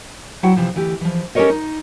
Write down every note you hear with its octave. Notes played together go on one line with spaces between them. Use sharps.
F#3 E4 F#4 F#5 G5
C3 E3 F3
D2 E3 G4
E3 F3
C#4 G4 A4 A#4 C#5 D#5
D#4